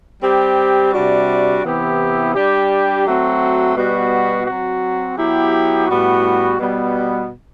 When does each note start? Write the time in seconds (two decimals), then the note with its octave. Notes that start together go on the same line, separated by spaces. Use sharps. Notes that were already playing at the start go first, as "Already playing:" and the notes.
0.21 G3 C4 G4
0.93 C3 G3 D4 F#4
1.63 C3 E3 B3 E4 G4
2.34 G3 D4 G4
3.04 F#3 A3 C4 F#4
3.75 B2 G3 B3 F#4
4.46 F#3 C4 F#4
5.17 F#3 B3 E4 G4
5.88 A2 G3 B3 F#4
6.59 B2 G3 B3